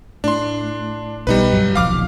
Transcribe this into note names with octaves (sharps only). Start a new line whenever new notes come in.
A2 D4 C6
B1 B2 G3 D#4 B4
C#2 G2 F#3
D#1 B1 F3 F5 D6 F6